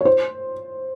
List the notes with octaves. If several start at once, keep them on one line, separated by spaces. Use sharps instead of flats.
C#5
C5